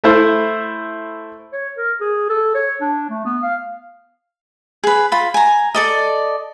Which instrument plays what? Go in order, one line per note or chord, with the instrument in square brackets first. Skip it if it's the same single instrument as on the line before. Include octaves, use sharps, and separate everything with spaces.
[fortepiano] A3 E4 C5
[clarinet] C#5
A#4
G#4
A4
C#5
D4
A3
B3
F5
[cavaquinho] G#4 B4
F4 B5
G#5 A#5
A4 D5 D#5